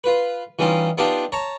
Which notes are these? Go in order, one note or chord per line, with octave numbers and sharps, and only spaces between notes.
F4 B4
E3 G3 C#4 D#4 F4
B3 D4 D#4 F4 G4 A5
C#5 A5 A#5